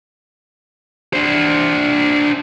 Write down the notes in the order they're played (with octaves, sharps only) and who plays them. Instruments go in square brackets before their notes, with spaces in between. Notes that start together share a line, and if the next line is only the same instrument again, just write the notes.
[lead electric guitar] D4 C5